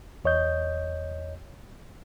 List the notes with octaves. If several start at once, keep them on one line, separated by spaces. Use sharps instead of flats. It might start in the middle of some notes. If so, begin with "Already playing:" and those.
E2 C#5 D#5 G6